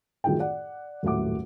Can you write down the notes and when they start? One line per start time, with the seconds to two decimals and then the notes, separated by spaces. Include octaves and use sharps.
0.24 F#2 A2 D#3 F4 G#4 G5
0.39 D5 F#5
1.03 D#1 F#2 A2 F#5 D6